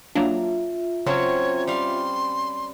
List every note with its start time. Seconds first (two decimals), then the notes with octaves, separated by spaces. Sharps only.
0.15 F#3 A#3 D4 F4 E5 A#5
1.06 C#3 F#3 C4 C#4 C#5
1.67 G3 F5 C6